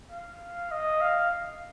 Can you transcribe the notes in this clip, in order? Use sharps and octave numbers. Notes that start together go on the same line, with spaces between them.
F5
D#5
F5